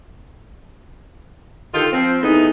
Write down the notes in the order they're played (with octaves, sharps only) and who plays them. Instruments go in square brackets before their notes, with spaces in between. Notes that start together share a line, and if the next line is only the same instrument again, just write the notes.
[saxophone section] D3 D#3 F4 G4 A4
F3 C4
E2 A3 B3 D#4